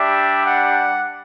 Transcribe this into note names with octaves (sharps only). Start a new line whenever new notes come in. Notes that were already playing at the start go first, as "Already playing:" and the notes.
Already playing: G3 D4 G4 E5
F#5